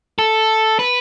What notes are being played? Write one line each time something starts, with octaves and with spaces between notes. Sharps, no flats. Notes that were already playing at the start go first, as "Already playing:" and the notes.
A4
B4